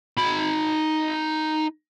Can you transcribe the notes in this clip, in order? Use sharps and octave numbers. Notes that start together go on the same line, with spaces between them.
D#4 B5